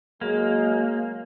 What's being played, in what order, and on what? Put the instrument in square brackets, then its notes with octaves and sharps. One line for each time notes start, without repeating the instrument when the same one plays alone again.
[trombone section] F#3 G#3 [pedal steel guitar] A#3